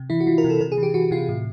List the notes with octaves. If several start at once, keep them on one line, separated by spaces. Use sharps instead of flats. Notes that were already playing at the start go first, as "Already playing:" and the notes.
Already playing: C3
E3 E4
F#4
E3 F4
A#4
C3
A4
C3 A#4
G#4
E3
G4
E3 F#4
C3 F4
A2